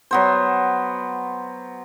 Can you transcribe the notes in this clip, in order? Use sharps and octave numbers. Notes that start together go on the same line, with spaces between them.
F#3 B3 C5